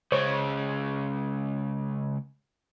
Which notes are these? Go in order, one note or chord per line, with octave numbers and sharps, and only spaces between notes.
C#2 C#3 C5 C#5